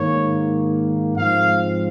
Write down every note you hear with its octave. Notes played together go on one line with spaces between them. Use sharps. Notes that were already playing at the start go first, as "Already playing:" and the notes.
Already playing: G#2 D#3 A#3 C#5
G#2 F3 C4 F5